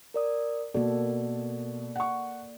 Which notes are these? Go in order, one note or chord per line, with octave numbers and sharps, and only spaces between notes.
A#4 D5 D#6
B2 A#3 A4 D5
F#5 C#6